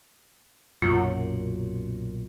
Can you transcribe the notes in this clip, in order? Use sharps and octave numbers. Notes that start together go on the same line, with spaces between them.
B1 F#2 A#2 F4